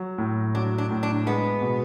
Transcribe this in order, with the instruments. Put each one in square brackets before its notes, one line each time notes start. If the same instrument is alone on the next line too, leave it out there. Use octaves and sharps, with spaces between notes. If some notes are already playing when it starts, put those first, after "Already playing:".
Already playing: [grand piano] F#3
A2
[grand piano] F#3 [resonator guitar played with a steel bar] D4
[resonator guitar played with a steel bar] D4
[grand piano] A2
[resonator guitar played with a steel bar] D4
[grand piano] G#3 [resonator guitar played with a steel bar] B3
[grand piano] B2